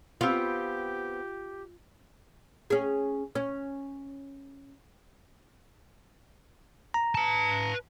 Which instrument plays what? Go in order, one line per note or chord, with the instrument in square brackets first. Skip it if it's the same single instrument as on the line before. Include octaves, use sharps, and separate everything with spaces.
[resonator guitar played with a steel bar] B3 C4 [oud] F4 [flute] G4
[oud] C#4 G#4
C#4
[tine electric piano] A#5
[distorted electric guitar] B4 A5